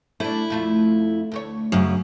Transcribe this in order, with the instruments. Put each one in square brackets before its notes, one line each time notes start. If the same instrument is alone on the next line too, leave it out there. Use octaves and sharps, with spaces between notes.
[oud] A3 D4 [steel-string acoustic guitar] E4
[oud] F2 A3 F4
D2 A3 C#5
[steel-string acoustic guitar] F#2 C#3